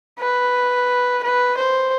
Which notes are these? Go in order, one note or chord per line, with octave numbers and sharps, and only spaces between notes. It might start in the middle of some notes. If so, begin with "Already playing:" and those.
B4
B4
C5